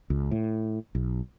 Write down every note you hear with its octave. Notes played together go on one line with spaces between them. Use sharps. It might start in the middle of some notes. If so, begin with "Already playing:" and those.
C#2
A2
B1